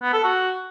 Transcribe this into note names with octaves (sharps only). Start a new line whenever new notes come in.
B3
A4
F#4